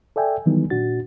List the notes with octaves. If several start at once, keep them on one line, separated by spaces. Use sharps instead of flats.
A4 D5 E5 G5 G#5
D#3 E3 F#3 G3 B3 D#4
A#2 D4 F#4 A6